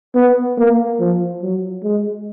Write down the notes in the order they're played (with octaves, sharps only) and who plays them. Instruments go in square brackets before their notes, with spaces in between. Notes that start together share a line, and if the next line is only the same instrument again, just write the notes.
[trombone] B3
A#3
F3
F#3
G#3